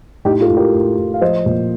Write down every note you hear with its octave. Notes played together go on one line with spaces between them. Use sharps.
A2 D#4 G4
F4 A4
A2
G4 A#4
A2
A2
F5
F3 C5 D#5
A#2